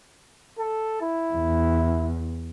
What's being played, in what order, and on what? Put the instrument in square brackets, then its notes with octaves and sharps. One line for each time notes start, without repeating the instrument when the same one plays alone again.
[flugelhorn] A4
E4
[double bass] E2